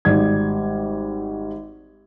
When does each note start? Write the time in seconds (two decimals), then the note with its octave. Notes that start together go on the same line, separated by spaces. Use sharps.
0.05 G#1 G3 G#6